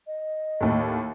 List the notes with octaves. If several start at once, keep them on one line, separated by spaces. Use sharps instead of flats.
D#5
D#2 A2